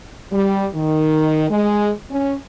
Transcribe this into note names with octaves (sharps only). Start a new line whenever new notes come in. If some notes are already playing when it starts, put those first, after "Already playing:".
G3
D#3
G#3
C#4